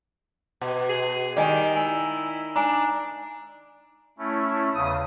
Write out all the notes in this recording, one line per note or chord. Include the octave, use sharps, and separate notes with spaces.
B2
G#4
D#3 G3 D5 D#5 G#5
E4 G#5
D4 G#5 A#5
A3 C#4 E4
E2 C#3 D#6